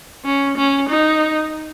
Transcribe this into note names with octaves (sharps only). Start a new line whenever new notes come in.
C#4
C#4
D#4